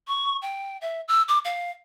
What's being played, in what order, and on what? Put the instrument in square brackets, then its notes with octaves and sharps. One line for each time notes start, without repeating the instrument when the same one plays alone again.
[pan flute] C#6
G5
E5
E6
D6
F5